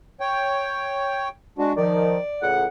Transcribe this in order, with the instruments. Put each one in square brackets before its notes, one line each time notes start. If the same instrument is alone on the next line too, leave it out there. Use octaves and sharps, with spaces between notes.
[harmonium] C#5 G5
G#3 D4 F#4
[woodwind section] D#3 F3 [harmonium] D5
[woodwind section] C#2 A2 F#5